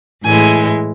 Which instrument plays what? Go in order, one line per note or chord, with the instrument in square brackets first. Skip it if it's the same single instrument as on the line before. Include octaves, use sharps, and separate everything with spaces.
[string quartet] A2 E3 G#3 G#5